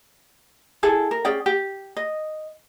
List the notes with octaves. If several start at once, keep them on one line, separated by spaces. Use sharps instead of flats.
E4 G#4 A4
A#4
C#4 G#4 D5 G5
G4
D#5